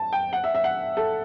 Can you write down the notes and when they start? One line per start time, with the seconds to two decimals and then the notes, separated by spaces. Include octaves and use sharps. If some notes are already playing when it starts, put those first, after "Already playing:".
Already playing: A5
0.13 G5
0.33 F#5
0.44 E5
0.55 E5
0.64 F#5
0.97 A4